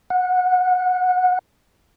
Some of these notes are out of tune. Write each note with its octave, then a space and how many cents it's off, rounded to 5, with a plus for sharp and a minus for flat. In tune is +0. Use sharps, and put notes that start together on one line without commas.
F#5 -20